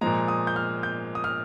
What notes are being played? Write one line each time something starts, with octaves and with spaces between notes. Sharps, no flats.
A#2 F3 G#3 A#5
D#6
G6
F6
G6
D#6
F6